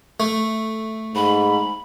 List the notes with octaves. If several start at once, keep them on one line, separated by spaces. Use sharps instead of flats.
A3
G#2 B5